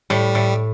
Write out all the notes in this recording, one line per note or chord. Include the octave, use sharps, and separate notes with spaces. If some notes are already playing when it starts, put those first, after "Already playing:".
A2 G3
A2